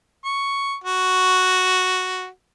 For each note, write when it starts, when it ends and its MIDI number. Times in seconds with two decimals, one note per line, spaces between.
0.25 0.75 85
0.84 2.26 66